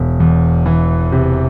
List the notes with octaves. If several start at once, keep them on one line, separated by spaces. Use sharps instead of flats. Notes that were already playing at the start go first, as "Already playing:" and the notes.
Already playing: E1
E2
E3
C3